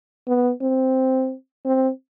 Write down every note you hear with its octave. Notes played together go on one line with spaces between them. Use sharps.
B3
C4
C4